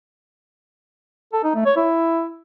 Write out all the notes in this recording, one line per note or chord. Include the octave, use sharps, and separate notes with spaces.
A4
D#4
A3
C#5
E4